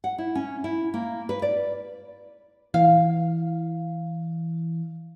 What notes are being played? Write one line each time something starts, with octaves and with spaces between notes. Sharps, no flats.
F#5
E4
C#4
E4
A#3
B4
D5
E3 F5